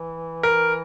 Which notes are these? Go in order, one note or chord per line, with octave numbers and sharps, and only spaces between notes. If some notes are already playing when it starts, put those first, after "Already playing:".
Already playing: E3
A#4